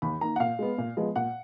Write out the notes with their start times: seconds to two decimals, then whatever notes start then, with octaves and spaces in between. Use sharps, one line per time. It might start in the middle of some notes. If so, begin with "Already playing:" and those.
0.02 D#2 B5
0.21 D#3 A#3 A#5
0.36 F#5
0.40 A#2 F5
0.59 G#3 B3
0.78 A#2
0.97 F3 G#3 B3
1.16 A#2 F#5